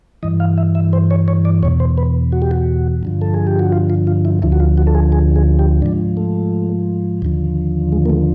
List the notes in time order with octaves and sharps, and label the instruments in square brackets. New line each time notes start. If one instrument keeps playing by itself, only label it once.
[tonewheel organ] G2 E3 D#5
F5
E5
E5
C5
C#5
C#5
D5
E2 B2 C#5
C5
B4
F#4
G4
F#4
G2 D3 F3
A4
G#4
G4
F#4
F4
F4
F4
E4
D2 D3 F3 E4
F#4
F4
F#4
A4
G#4
G#4
G#4
G4
G#2 F3 D4
A3
D#2 D3 F3
G#3
A#3
A3